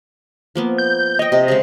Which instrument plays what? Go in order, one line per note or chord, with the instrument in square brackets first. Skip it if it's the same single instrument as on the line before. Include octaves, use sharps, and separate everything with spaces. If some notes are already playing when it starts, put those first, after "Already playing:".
[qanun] F3 A#3 B3
[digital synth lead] G6
[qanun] C#5 G5 [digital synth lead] D#5
[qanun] C3
C#3 G#3